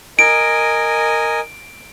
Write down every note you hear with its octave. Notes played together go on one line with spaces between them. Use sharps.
A#4 D#5 G#5 D7